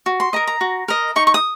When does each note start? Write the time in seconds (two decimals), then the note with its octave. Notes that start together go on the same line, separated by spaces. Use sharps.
0.06 F#4
0.20 C6
0.33 A#4 D#5 A#5
0.47 A#5
0.61 F#4
0.88 A#4 D#5
1.16 D#4 C#6
1.27 C#6
1.34 D#6